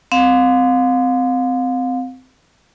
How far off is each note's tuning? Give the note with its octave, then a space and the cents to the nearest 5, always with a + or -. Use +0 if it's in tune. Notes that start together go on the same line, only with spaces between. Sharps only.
C4 -20 F5 +35